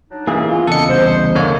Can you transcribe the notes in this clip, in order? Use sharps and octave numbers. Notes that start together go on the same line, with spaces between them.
F#3 D4 D#4
G2 B2 E3 A#3 C#4 G#4
A#3 B3 F4
E2 C#3 D4 A4 D#5 C#7
C2 C5
D3 A3 A#3 C#5